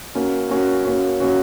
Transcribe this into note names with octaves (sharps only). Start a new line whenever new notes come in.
A#3 C#4 F#4
A#3 C#4 F#4
A#3 C#4 F#4
A#3 C#4 F#4